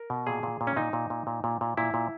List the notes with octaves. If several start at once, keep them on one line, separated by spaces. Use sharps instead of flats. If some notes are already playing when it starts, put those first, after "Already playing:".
Already playing: A#4
B2
A#2 G#4
A#2
A#2
C#4
A#2 D#4
A#2
A#2
A#2
A#2
A#2
A#2 E4
A#2